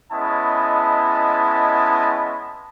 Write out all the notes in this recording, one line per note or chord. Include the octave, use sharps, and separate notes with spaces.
G#3 B3 C#4 E4 D#5 A5